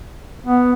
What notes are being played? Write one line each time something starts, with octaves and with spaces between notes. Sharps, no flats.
B3